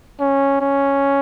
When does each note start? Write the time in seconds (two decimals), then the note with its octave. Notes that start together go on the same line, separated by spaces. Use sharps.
0.20 C#4
0.61 C#4